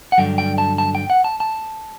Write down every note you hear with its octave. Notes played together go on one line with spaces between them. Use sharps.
F#5
G2 D3 F#3 G5
G5
A5
A5
G5
F#5
A5
A5